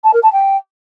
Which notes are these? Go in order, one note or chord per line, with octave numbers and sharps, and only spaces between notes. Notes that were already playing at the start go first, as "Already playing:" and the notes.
A5
A#4
A5
G5